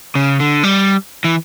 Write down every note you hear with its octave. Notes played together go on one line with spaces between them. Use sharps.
C#3
D3
G3
E3